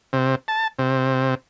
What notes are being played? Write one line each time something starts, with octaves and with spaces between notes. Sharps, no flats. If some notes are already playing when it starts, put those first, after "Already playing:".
C3
A5
C3